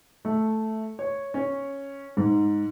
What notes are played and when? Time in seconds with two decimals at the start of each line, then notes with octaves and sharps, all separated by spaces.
0.25 A3
0.99 C#5
1.34 C#4
2.17 G#2